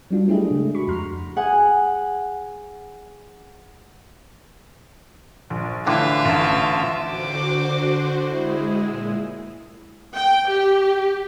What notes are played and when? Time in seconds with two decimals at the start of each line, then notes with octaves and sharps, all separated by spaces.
0.10 F#3 G3 D4 F4
0.28 A3 D4 E4 G4 G#4 D#5
0.50 A2 C#3 G#3 A3
0.74 F#4 B5 C#6
0.87 F2 A#5 C6 F6
1.36 G#4 F#5 G#5
5.50 A#1
5.86 A2 D3 E3 F4 E5
6.25 A1 A5
7.05 D3 F#4 C5 D6
8.33 G#3 E4 G#4
8.85 A#2
10.15 G5
10.49 G4